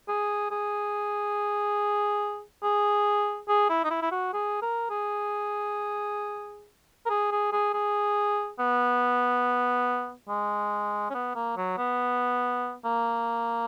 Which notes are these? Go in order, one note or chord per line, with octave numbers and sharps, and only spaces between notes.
G#4
G#4
G#4
G#4
E4
D#4
E4
E4
F#4
G#4
A#4
G#4
A#4
G#4
G#4
G#4
G#4
B3
G#3
C#4
B3
A#3
F#3
B3
A#3